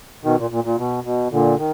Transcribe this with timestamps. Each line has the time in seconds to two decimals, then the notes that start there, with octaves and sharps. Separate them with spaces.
0.24 B2 D#3
0.38 A#2
0.51 A#2
0.64 A#2
0.77 B2
1.04 B2
1.31 A#2 D3
1.58 D#3